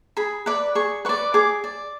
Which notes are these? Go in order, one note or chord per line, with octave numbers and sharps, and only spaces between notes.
G#4 B5
B4 D5 B5
G#4 C#6
B4 D5 C#6
G#4 D6
D5